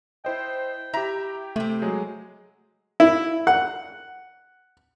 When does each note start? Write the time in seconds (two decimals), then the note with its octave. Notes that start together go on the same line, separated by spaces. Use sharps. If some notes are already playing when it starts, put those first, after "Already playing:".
0.25 E4 C5 D#5 G5
0.93 E4 G4 E5 A#5
1.56 C3 A3 C4
1.82 F#3 G#3 G#4
3.00 E4
3.47 F#5